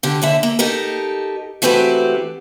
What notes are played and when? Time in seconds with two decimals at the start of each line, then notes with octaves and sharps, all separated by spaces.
0.03 D3 G4
0.22 D#2 D3 E5
0.43 A#3
0.59 D#4 G4 A4 A#4
1.62 E3 A3 C4 F#4 G4 B4